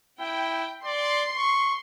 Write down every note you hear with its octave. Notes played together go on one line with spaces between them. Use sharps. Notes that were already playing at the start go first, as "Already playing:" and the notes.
E4 G5
D5 C6
C#6